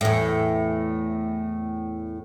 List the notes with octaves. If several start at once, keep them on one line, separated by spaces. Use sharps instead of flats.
E2 A2